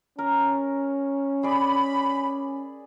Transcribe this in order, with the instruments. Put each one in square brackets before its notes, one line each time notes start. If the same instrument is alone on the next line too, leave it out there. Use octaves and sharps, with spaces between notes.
[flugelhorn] C#4 [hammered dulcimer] A#4
[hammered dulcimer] G#4 D5 [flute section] B5